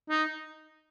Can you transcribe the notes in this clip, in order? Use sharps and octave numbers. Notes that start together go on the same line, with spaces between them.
D#4